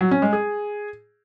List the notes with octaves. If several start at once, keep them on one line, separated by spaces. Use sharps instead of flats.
F#3
C#4
G#3
G#4